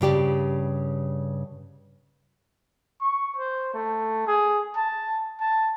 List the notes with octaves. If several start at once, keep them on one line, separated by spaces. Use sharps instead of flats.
G2 C#3 G4 D5
C#6
C5
A3
G#4
A5
A5